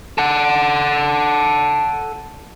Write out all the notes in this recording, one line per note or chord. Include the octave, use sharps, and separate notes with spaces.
A4 F#5